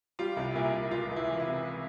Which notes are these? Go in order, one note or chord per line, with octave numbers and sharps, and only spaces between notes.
G3 F4
C2
A#2 E4
C2
C#2 F4
C#2
E4
E3
E4
C3